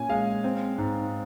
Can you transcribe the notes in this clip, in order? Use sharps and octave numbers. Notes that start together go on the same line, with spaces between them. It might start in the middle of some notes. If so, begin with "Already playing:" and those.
Already playing: A#2 C#4 G#5
G#3 F5
C4
G#2